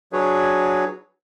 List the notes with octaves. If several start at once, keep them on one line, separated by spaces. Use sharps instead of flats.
F#3 D4 F#4 G#4 B4 C#5